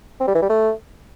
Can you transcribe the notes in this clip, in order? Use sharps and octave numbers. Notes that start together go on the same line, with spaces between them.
C4
G3
E3
G3
A3